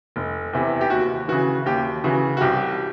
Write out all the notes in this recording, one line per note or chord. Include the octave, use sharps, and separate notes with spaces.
F1
E2 C3 E3
G4
D#2 F#4
C#3 E3 F#4
D#2 G4
C#3 E3 F#4
F#4
C2 G4